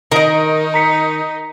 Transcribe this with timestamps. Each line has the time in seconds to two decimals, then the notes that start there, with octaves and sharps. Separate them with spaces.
0.12 D#3 D#4 A#4 D#5
0.74 A#5 B6 C#7